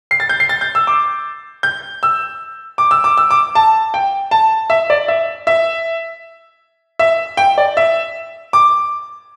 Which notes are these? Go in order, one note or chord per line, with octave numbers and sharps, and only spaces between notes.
C7
A6
G6
C7
A6
G6
E6
D6
G6
E6
D6
E6
D6
E6
D6
A5
G5
A5
E5
D5
E5
E5
E5
G5
D5
E5
D6